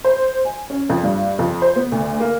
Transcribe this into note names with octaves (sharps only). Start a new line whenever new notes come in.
C5
G#5
C#4
F2
G2
F2
C5
B3
D2
A#3